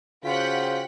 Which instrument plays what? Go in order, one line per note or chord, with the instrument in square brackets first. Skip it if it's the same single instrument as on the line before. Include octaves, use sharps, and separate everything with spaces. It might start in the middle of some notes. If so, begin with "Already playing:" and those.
[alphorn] C#3 [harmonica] F4 F#4 C5 [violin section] F#5 G5 B6